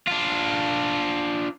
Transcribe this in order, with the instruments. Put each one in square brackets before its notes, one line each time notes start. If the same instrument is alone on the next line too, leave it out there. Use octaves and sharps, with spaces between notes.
[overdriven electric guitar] D4 F4